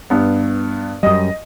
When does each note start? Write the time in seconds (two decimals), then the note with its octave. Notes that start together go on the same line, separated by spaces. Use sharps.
0.10 G2 B3
1.03 F#2 G3 D#5 D#6